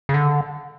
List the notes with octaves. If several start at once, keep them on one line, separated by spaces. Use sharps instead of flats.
C#3
D3